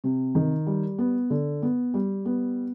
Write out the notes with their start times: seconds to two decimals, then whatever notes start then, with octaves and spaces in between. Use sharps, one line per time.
0.04 C3
0.35 D#3
0.67 G3
0.98 B3
1.30 D3
1.62 B3
1.94 G3
2.25 B3